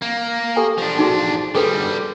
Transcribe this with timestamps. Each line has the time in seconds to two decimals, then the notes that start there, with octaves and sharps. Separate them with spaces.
0.02 A#3
0.56 G4 A4 G#5
0.78 F3 D4
0.99 D#4 F#4 G#4
1.55 D3 G3 G#4 A4 B4